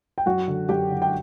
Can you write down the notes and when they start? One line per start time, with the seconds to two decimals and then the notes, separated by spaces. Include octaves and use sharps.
0.18 G5
0.26 F#2 F#4 F#5
0.48 D3
0.69 F#2 G4 G5
0.91 D3
1.02 G5